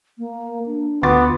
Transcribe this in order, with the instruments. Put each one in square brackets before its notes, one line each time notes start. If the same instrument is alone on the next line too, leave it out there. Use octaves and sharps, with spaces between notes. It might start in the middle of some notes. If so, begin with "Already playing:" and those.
[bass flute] A#3
D4
[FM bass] D2 [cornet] B3 [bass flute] F4 [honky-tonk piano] C6 D6 A6